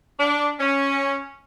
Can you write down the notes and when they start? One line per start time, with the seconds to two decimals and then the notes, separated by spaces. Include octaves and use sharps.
0.20 D4
0.59 C#4